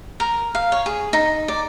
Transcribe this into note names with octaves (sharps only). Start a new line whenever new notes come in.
A#4
F5
C#5
G#4
D#4
D5